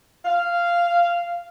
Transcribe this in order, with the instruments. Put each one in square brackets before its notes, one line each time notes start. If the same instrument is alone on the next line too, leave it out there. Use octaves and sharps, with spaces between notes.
[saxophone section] F5